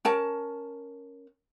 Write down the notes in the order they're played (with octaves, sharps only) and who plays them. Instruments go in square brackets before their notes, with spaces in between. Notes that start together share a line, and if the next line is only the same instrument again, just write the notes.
[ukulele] C#4 A#4 A5